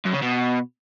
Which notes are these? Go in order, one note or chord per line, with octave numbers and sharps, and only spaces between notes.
F#2
C#3
B2